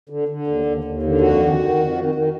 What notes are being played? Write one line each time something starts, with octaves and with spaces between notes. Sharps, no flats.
D3
D3
D#2
D#2
D#2
D3
F2 F#4
D#3
D#3
F2
D#3
D#3